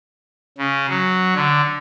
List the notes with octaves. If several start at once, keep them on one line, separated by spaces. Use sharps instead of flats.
C#3
F#3
D3